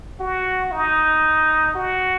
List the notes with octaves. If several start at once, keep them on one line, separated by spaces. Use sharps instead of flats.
F#4
D#4
F#4